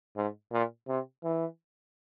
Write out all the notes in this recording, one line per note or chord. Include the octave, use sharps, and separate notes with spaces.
G#2
A#2
C3
E3